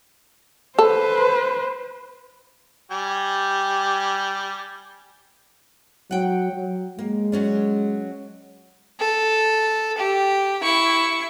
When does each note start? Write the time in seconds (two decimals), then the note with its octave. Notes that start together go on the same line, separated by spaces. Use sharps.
0.79 A4 B4 C5
2.91 G3 G4 G#5
6.11 F#3 F#5 G5
6.53 F#3
6.99 G#3 A#3
7.32 F#3 C#4 D4
8.99 A4
9.98 G4
10.63 E4 C#6